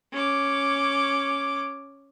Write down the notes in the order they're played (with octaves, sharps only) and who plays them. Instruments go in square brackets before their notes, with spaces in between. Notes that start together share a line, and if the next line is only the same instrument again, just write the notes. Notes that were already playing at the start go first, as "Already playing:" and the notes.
[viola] C#4 D6